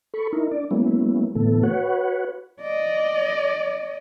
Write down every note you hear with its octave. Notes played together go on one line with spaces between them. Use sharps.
A4 B5 C#6
D#4 E4 A#4
D4 D5
F#3 G#3 A#3 B3 C#4 E4
A2 D3 E3 A3 B3 A4
F#4 B4 C#5 F#5
D5 D#5